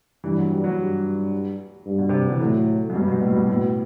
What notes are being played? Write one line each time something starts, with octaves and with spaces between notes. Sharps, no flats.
G2 E3
F#3
G3
F#3
G2
G2
B2
C3
D3
E3
A2 F#3
F#2
G2 B2
F#2
A2
G2
A2